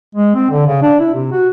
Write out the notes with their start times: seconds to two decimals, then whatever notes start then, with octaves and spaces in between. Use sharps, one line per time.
0.15 G#3
0.35 C4
0.50 D3
0.66 C#3
0.82 D4
1.00 E4
1.14 C3
1.32 F#4